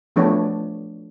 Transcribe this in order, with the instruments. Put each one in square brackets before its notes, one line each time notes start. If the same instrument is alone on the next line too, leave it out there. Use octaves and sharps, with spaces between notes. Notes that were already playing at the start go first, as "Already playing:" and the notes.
[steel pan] F3 A3 B3 D4 C#5